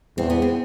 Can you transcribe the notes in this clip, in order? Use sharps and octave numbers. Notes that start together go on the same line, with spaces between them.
E2 C4
B3
C4